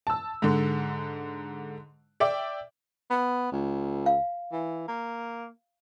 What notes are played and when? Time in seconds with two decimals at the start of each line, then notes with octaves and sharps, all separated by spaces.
0.07 A5 E6
0.42 G#2 D3
2.20 D5 E5 G5 D6
3.10 B3
3.52 C#2
4.06 F5
4.52 E3
4.88 A#3